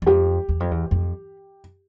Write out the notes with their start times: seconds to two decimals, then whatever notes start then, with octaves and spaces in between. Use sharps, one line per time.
0.02 E2
0.06 F2 G4
0.49 E2
0.60 F2
0.71 E2
0.91 F2